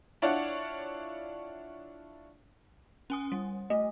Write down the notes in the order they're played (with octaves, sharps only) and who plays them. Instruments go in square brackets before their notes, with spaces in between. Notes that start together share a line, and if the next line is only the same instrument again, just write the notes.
[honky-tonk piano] D4 E4 F4 C#5 D5 F#5
[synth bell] C#4 G#5 D#6
G3
[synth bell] A3 [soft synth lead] D#5